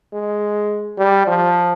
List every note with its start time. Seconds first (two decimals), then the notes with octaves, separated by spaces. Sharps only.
0.13 G#3
0.98 G3
1.27 F3